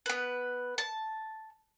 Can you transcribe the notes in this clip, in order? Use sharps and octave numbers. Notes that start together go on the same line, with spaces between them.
B3 B4
A5